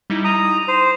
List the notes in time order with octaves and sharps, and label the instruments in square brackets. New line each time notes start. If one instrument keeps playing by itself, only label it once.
[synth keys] G3 D#4 E4
[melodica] A#5 D#6
[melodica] C5 [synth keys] D#7